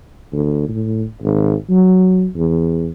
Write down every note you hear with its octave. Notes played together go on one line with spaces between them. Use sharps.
D2
A2
G#1
F#3
E2